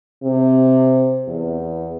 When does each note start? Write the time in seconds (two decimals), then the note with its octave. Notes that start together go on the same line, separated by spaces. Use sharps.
0.23 C3
1.28 E2